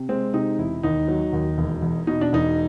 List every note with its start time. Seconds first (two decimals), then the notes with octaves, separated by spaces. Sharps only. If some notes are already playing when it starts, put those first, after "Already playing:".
Already playing: C3
0.09 G#3 C4
0.34 C3 D#4
0.58 E1 E4
0.83 D#2 D#4
1.08 F#3
1.33 D#2
1.58 E1
1.82 E2
2.07 B2 D#4
2.21 D4
2.33 E1 D#4